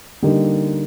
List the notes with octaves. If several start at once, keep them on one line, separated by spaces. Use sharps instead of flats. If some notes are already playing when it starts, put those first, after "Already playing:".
D3 G3 A#3 D#4 G4